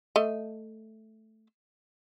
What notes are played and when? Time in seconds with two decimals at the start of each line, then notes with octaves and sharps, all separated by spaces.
0.16 A3 D#5